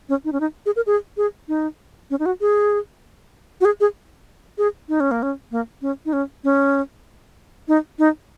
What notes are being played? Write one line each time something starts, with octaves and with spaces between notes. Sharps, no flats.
C#4
D#4
C#4
D#4
G#4
A#4
G#4
G#4
D#4
C#4
D#4
F#4
G#4
F#4
G#4
G#4
G#4
D#4
C#4
A#3
C#4
A#3
C#4
D#4
C#4
C#4
D#4
D#4